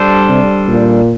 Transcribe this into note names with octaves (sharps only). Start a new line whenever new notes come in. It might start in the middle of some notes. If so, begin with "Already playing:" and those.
Already playing: G3 D4 A4 C5
C3
A#2